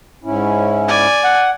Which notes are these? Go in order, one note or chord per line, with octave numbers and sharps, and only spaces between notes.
G#2 C#4 E4
D5 G#5
F#5